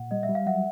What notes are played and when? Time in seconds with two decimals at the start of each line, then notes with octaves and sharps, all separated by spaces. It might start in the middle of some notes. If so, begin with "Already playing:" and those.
Already playing: A#2 F#5
0.11 G3 D#5
0.23 E5
0.29 G3
0.35 F5
0.47 F#3 E5 F#5